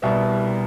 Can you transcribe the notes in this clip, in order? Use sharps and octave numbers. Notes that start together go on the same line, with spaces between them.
C2 B2 G3 B3 E5